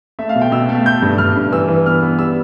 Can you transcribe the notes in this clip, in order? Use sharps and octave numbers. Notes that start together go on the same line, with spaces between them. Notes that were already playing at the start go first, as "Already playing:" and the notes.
A3 E5
F5
B2
G5
B2 E6
A3
A3 G6
G2
G2 F6
G2
E3 E6
E3
B3 F6
B3
G3 E6